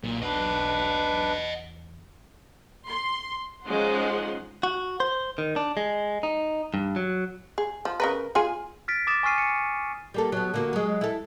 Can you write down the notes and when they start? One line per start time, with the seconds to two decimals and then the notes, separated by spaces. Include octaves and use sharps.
0.03 B1 A#2
0.22 E2 D4 B4 D#5 F#5
2.88 C6
3.65 F3 G#3 C#4 D#4 F#5 C6
4.63 F#4
5.00 C5
5.38 D#3
5.56 D4
5.77 G#3
6.23 D#4
6.74 G2
6.96 F#3
7.58 G#4
7.85 F3
8.00 C#3 A#4 B4
8.35 F4 G#4 G#5
8.88 F6 A6 B6 D7
9.07 D6 D#6 A6 E7
9.23 G#5 C#6 D6 F6 C7 D#7
9.38 C#7
10.14 G3 A#3 A4
10.32 F#3 B3
10.54 D3 A#3 F#4
10.73 F#3 G#3
11.01 E4 A4